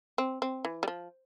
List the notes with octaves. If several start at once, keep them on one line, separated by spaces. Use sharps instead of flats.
C4
C4
E3
G3
F3